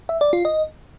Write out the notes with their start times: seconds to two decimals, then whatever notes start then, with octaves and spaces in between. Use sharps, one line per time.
0.09 E5
0.21 D5
0.33 F4
0.45 D#5